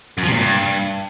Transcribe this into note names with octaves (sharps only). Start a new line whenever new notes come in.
F#2
F3
C3
A#2
G2